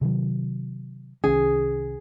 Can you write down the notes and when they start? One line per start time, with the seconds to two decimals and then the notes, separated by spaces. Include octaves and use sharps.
0.01 C3 D#3 F#3
1.24 C2 D#3 C#4 G#4